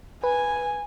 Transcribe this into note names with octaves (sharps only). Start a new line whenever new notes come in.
B4 G#5